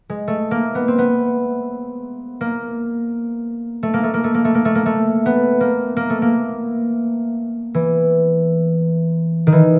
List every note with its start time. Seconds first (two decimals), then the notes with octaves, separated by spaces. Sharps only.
0.09 G#3
0.27 A3
0.51 A#3
0.75 B3
0.88 C4
0.98 B3
2.41 A#3
3.83 A3
3.94 A#3
4.03 A3
4.14 A#3
4.24 A3
4.34 A#3
4.45 A3
4.55 A#3
4.65 A3
4.75 A#3
4.86 A3
5.26 B3
5.60 A#3
5.97 A#3
6.10 A3
6.22 A#3
7.74 E3
9.47 D#3
9.52 E3